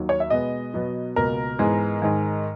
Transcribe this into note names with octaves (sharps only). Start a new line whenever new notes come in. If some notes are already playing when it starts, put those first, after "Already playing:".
Already playing: D#2 D#3 F#3
C#5
E5
B2 G#3 B3 D#5
B2 F#3 B3
C#2 B2 A#3 A#4
G#2 E3 G#3 B3
G#2 D#3 G#3